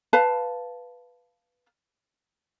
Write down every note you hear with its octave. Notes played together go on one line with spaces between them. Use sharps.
B4 F5 A5